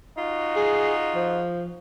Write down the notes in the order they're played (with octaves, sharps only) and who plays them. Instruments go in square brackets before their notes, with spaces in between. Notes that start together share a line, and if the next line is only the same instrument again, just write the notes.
[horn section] D#4 F4 F#4
[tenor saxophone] G#4
F3